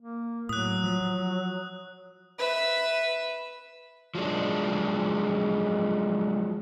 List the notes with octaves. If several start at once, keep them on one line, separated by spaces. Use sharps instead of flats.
A#3
A2 F#3 D#6 F#6
F3
B4 E5
F3 F#3 G#3 D4